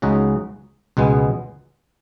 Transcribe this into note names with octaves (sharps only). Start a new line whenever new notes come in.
C#2 C#3 G#3 D#4 F#4
C#2 B2 G#3 B3